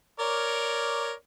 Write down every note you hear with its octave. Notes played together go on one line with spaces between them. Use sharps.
A#4 C#5 D5